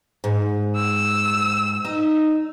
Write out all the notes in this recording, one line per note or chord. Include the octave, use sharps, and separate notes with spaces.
G#2
E6
D#4